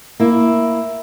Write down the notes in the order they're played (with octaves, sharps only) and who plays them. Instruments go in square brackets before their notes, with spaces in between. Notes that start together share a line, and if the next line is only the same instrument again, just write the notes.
[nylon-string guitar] A#3 E4